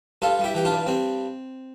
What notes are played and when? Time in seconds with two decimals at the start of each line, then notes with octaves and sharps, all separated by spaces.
0.22 G2 F4 A4
0.39 G3 E4 G4
0.55 E3 G4
0.65 D4 F4
0.71 G2
0.86 G2 C4